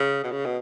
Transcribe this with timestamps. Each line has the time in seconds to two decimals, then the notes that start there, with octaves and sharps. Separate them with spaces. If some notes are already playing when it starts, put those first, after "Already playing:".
Already playing: C#3
0.24 B2
0.32 C#3
0.46 B2